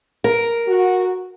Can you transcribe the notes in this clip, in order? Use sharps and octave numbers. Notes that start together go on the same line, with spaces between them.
A#4
F#4